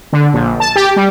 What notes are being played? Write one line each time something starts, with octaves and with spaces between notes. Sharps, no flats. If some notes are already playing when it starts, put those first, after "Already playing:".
D3
A#1
A5
G4
G3